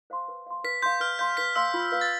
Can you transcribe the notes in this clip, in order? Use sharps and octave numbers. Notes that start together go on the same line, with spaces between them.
C5 F5 C6
B4
F5 C6
B4 B6
F5 C6 G6
B4 F6
F5 C6 G6
B4 B6
F5 C6 E6
F4
B4 F5
A6